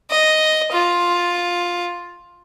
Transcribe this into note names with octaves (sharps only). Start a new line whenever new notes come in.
D#5
F4